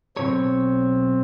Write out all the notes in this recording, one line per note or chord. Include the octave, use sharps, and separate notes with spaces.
B1 C3 C4 C#5